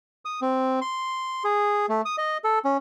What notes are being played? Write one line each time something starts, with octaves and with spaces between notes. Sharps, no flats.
D#6
C4
C6
G#4
A3
D#6
D#5
A4
C#4